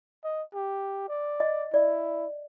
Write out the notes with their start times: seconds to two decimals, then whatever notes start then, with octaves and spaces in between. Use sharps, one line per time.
0.24 D#5
0.55 G4
1.08 D5
1.40 D#5
1.74 E4 D5